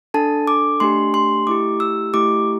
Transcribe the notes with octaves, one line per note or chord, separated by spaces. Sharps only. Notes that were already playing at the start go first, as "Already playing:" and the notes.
D4 A4 A5
D6
A3 D4 G4 C6
C6
A3 E4 G4 D6
E6
A3 E4 G4 D6